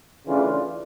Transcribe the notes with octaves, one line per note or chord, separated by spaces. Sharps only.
C#3 E3 A3 D4 F4